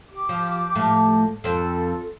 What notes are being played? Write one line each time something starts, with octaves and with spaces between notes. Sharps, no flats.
G4 D6
F3
A2 F3 A3
F2 C4 F4 A4